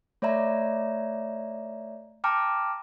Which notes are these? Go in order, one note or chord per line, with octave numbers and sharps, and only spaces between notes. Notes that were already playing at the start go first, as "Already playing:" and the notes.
A3 C#5 D5 E5 A#5
G5 A5 A#5 D6 F6